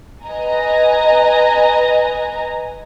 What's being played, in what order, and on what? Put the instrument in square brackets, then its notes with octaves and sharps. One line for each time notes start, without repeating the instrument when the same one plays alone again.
[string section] B4 D#5 G#5 A#5